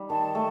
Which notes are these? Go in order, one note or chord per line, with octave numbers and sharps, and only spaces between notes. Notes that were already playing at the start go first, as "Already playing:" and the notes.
Already playing: G3 D#4
D#3 A5
A3